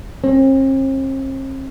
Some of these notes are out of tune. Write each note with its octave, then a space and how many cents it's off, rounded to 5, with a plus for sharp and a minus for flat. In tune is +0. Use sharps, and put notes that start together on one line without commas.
C4 +45